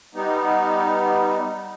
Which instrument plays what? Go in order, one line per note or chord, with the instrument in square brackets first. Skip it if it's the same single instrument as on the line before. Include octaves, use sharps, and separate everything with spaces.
[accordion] G3 B3 D#4